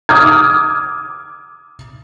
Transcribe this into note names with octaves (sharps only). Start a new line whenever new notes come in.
D6 D#6 F6 G#6